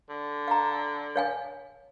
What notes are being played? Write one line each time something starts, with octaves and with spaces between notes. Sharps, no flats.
D3
F5 A#5
C#5 F5 G#5